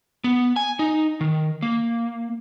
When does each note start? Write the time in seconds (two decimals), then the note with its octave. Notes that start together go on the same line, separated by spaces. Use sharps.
0.24 B3
0.56 G#5
0.79 D#4
1.21 D#3
1.62 A#3